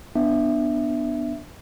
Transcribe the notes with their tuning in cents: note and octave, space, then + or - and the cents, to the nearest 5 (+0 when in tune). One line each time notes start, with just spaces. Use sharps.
B3 +0 D4 +15 E5 +0